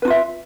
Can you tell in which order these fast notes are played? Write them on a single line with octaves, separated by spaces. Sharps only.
B4 D#4 F4 E5